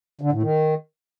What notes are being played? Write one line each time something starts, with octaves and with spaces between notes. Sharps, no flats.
D3
A2
D#3